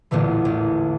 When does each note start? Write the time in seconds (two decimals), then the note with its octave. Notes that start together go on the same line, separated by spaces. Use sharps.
0.11 A1 E2 A#2 D3 E3
0.45 A1